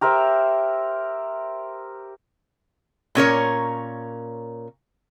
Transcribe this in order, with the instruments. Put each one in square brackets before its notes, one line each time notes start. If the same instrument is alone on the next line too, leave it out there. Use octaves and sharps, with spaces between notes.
[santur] G4 A#4 C5 E5
[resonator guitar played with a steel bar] A#2 C#4 A#4 C#5